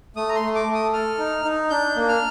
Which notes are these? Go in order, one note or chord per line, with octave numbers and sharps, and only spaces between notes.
A3 D#6
A#5
C6
A3
D6
A3
D#6
A4 F6
D#4
D#4
D4 G6
A#3
F6